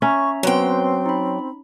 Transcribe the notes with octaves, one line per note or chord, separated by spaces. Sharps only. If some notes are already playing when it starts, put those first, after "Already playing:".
C#4 E5 A#5 C#6
F#3 B3 C4 B4 G5 C6
D#4 B5